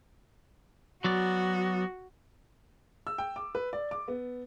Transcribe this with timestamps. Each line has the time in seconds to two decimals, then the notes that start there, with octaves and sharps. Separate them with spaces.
1.04 F#3 B3 F#4 D5
3.07 E6
3.18 G5
3.36 D6
3.55 B4
3.73 D5
3.91 D6
4.08 B3